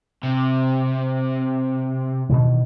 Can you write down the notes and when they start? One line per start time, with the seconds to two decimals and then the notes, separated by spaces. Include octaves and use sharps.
0.23 C3
2.30 B2 D#3 E3